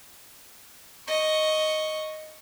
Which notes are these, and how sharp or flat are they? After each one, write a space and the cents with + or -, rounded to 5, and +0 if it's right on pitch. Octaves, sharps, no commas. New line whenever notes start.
D#5 +0 C#6 +0